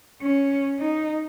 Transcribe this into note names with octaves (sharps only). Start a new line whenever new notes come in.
C#4
D#4